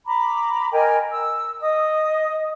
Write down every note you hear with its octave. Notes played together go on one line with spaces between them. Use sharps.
A#5 B5 D6
A#4 D#5 G5 G#5
E6
D#5 D#6